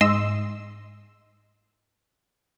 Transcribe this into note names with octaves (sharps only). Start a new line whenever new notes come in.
G#2 D#5 C6 E6